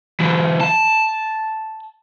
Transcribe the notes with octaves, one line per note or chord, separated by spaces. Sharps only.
E3 F#3
A5